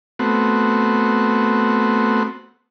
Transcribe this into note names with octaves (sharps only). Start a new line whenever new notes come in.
A3 B3 C4 F#4